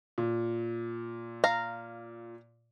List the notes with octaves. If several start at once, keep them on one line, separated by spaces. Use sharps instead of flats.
A#2
F5 A#5